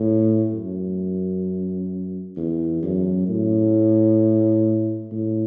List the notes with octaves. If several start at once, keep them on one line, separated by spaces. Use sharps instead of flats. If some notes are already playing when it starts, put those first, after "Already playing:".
Already playing: A2
F#2
E2
F#2
A2
A2